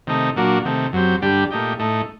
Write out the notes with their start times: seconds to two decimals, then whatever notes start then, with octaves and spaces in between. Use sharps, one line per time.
0.07 C3 D#3 A3 D#4
0.36 A#2 F#3 A#3 D4 F#4
0.65 C3 D#3 A3
0.93 F#2 F#3 C4 G4
1.21 G2 D3 G3 D4 G4
1.51 A#2 A3 D#4 G4
1.79 A2 A3 D#4